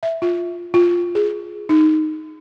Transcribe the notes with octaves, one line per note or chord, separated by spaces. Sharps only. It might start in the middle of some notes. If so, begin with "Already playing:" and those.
E5
F4
F4
G#4
D#4